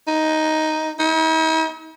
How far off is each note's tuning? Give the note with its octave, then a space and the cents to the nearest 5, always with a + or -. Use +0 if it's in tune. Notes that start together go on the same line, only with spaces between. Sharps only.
D#4 +5
D#4 +45